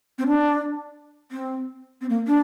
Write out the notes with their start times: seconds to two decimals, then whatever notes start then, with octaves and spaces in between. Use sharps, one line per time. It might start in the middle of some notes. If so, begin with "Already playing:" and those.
0.18 C4
0.27 D4
1.31 C4
2.01 C4
2.09 A#3
2.27 D4